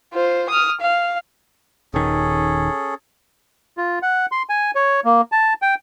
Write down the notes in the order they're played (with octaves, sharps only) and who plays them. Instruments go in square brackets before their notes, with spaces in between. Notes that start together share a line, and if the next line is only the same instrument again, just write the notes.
[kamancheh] F4 C5
D#6 F6
F5
[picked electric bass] D#1 D#3 [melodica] C#4 G#4 A4
[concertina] F4
F#5
C6
G#5
C#5
A#3
A5
G5